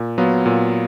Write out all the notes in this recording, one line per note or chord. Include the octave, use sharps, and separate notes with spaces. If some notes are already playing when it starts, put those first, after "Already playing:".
Already playing: A#2
F#3 B3 F4
A#2